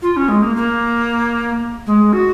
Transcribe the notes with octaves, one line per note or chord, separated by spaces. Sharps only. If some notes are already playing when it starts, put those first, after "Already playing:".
F4
C#4
G#3
A#3
A#3
G#3
F#4